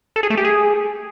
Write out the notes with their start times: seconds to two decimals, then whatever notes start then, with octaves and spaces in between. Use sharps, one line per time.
0.16 A4
0.23 G#4
0.30 A3
0.37 G4
0.45 G#4